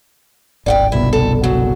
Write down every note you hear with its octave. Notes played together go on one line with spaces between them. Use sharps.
D1 G#1 D5 F#5 G5
G1 C2 B2 E4
A4
C#3 F#3